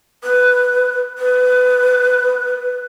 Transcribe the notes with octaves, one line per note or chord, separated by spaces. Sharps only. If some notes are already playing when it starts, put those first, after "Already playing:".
B4
B4